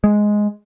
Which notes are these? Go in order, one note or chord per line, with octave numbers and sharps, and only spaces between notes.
G#3